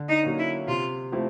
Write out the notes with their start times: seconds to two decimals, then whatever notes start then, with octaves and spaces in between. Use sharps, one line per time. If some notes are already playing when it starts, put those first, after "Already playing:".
Already playing: D3
0.09 D#4
0.23 F#3 A#3 C#4
0.39 E4
0.68 C3 F4
1.12 F3 A3 C4 E4